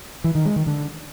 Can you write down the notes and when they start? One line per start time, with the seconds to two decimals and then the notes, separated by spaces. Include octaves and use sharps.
0.24 E3
0.35 D#3
0.46 G#3
0.56 D#3
0.67 D3